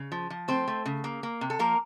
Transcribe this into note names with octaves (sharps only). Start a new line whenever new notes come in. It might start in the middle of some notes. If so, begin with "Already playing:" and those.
Already playing: C#3
F3
F3
A3 C4 C5
A3
C#3
A#3
A#3
C3
A4
F3 A#3 A#4